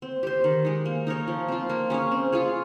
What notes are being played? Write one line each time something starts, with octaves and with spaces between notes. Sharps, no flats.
C4
G4 C5
D#3
G#3 D#4
A#3
D#4 A#4 C#5
F3
C4 F4
A#3
C#4 G#4 C#5
C4
F4 G#4 C#5